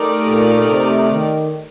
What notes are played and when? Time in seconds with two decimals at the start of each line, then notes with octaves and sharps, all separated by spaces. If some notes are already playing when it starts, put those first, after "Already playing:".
Already playing: A3 D#4 G4 A#4 D5
0.25 A#2
0.68 C3
1.11 D#3